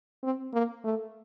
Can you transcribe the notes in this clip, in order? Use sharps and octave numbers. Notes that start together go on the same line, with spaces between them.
C4
A#3
A3